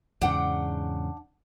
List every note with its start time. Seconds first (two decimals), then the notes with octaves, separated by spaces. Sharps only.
0.22 E2 G#2 C#3 D4 F#5 G5